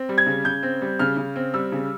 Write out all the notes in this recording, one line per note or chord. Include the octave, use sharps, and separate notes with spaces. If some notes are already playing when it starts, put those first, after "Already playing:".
Already playing: C4
G3
G#6
C#3
C#3 G6
C4
G3
C#3 F6
C#3
C4
G3 E6
C#3